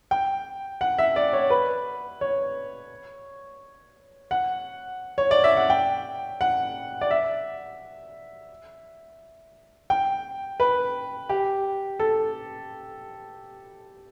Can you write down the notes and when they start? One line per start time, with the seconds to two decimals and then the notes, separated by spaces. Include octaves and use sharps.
0.11 G5
0.81 F#5
0.99 E5
1.16 D5
1.33 C#5
1.50 B4
2.21 C#5
4.31 F#5
5.18 C#5
5.31 D5
5.44 E5
5.57 F#5
5.70 G5
6.41 F#5
7.01 D5
7.11 E5
9.90 G5
10.60 B4
11.29 G4
11.99 A4